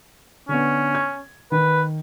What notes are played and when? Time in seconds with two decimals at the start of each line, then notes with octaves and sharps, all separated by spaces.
0.49 D3 B3 C#4
0.95 G#6
1.52 D#3 B4